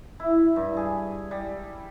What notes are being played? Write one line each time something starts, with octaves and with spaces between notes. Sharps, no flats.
E4
G2
G#4
G3